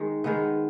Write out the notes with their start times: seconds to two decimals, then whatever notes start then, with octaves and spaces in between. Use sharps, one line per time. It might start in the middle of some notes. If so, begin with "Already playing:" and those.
Already playing: D#3 G#3
0.24 D#3 G#3 B3